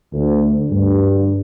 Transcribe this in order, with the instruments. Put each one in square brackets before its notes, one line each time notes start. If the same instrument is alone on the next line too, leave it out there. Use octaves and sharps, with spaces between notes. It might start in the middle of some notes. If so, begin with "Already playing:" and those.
[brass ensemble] D2
G2